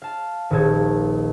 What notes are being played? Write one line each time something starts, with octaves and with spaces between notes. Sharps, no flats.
F5 A5
D#1 A#1 A#2 D#3 A5 G#6